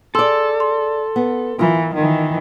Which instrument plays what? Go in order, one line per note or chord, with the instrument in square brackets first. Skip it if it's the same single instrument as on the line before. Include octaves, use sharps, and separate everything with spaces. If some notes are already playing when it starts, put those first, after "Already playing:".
[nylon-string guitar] G#4 D5 [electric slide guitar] A4 [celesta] C6 E6
[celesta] C6
[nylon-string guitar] B3
[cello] E3 [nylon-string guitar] F4 A#4
[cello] D#3 E3